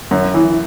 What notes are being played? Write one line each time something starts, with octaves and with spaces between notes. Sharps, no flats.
F#2
E3